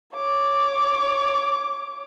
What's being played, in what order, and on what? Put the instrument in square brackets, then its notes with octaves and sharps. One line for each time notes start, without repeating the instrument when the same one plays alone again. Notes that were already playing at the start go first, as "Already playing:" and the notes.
[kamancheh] C#5 D6